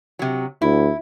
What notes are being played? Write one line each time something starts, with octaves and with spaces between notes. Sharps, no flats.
C3 F#3
D2 E4